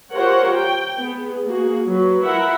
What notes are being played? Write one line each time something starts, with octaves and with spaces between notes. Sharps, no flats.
F4 G4 A#4 C5 C#5 F#5
G5
B3 G#4
A#3 F#4 G#4
F#3 B4
E4 F4 A#4 E5 F#5 B5